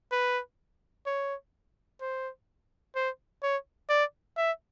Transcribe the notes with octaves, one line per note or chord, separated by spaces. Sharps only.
B4
C#5
C5
C5
C#5
D5
E5